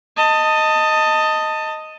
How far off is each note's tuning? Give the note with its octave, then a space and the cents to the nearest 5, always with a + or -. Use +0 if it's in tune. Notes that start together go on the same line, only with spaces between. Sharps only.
D#5 +0 A5 +20